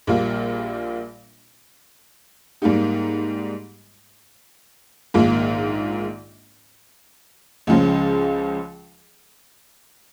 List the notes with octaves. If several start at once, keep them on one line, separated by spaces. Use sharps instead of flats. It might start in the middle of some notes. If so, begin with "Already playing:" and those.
A#1 A#2 G3 A#3 F4
G#2 G3 A#3 D#4 G4
A#1 G#2 D#3 A#3 F4
C#2 C#3 F3 G#3 C#4